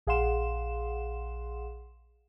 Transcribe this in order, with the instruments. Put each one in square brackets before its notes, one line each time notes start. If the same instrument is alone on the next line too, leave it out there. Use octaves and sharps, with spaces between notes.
[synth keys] A#1 G#4 F5 F#5 C6 E7